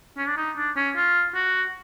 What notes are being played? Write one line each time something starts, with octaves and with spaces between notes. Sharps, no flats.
C#4
D4
D#4
D4
C#4
F4
F#4